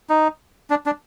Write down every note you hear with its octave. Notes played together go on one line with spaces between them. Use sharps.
D#4
D4
D4